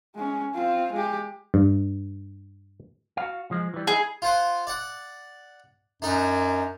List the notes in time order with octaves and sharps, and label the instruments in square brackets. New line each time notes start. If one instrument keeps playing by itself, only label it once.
[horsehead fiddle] G#3 C#4
C4 F4
G#3 G4
[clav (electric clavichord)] G2
[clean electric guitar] F#4 F5
F3 G#3
E3 G3
[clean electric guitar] D#4 E4 [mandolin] G#4
[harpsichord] F4 C5 F#5
D5 F#5
[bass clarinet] F#2 [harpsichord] D4 D#4 A#4